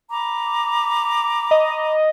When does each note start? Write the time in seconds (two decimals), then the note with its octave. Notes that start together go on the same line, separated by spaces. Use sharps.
0.10 A#5 B5 D6
1.51 D#5